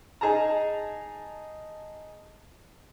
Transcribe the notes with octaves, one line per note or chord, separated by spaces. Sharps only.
D#4 G#4 A5 A#5